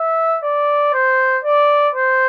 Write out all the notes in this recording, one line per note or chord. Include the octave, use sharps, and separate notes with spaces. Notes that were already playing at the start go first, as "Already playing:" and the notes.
Already playing: E5
D5
C5
D5
C5